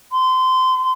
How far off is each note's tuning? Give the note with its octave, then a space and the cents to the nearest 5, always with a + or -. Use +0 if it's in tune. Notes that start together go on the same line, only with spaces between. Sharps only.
C6 -25